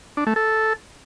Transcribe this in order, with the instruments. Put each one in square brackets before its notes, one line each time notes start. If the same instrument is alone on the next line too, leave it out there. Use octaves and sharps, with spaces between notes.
[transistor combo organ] D4
A3
A4